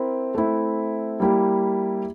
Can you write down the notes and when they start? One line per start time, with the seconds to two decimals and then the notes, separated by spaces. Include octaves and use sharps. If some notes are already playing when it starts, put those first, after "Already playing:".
Already playing: C4 E4 A#4
0.35 A3 C4 E4
1.20 G3 A#3 E4 G4